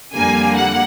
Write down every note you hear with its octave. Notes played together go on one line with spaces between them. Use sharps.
F2 D3 G3 A#3 G#5
F#5